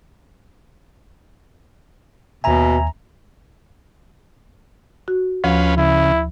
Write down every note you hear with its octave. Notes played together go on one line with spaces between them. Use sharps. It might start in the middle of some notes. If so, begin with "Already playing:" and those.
D#2 B2 E5 G#5 A#5
F#4
D2 F3 C#4 F4 B4
C#3 E4